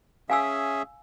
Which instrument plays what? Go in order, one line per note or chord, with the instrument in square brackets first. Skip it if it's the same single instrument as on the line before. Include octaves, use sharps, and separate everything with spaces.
[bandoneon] C#4 G#4 E5 [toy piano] F5 G#5 E6